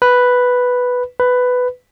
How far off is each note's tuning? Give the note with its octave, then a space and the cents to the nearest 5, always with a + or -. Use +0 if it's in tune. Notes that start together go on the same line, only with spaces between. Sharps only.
B4 +0
B4 +10